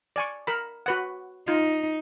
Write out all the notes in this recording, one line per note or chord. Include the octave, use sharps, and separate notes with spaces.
D5 G#5 C#6
A#4 B5
F#4 B4 F#5
D#4 F4